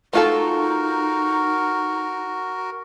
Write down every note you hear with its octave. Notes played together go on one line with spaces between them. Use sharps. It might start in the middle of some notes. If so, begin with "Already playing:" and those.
A3 D#4 F4 F#4 A4 A#4